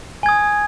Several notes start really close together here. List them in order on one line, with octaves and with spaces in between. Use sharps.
G#5 G#6 D#6